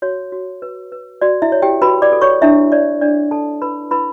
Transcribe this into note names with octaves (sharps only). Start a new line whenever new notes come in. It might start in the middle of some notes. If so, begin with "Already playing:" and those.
F#4 C#5
F#4
B4
B4
F#4 D5
E4 E5
C#5
G4 G5
F#4 B4 B5
D5 D6
A4
C#5 C#6
D4 E4 E5
C#5 D5
D4 D5
A4 A5
E4 B4 B5
E4 B4 B5